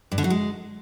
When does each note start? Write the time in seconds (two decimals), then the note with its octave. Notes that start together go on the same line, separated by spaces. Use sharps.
0.12 G2
0.18 D3
0.24 F#3
0.30 G#3